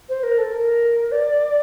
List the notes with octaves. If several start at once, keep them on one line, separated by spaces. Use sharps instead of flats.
C5
A#4
A4
A#4
D5